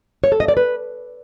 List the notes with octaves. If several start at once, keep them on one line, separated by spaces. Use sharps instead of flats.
C#5
A4
D#5
D5
B4